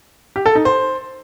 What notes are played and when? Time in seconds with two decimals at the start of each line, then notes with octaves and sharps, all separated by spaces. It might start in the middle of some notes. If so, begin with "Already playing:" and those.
0.36 G4
0.46 A4
0.55 D#4
0.65 C5